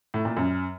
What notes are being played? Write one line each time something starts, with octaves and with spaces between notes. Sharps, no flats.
A2
A#2
F#2